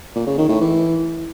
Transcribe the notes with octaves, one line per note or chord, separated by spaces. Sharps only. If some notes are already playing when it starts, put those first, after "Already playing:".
A#2
C#3
D#3
A2
E3